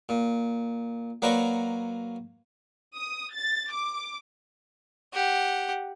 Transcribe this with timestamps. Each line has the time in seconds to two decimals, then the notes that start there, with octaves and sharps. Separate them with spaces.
0.09 A#2
1.22 F#3 A#3 B4 D5 A#5 C#6
2.95 D#6
3.34 A6
3.72 D6
5.14 G4 F#5